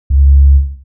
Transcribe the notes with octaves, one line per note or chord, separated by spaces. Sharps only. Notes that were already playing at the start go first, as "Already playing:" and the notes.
C#2